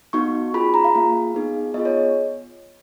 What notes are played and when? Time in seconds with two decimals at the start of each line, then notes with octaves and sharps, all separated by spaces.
0.13 B3 D#4 F#4 C#6
0.54 C#4 F4 G#4 B5
0.74 A#5
0.84 F5
0.95 A#3 F4 G#4
1.34 B3 D#4 G#4
1.74 B3 D#5
1.78 F4 G#4
1.85 C#5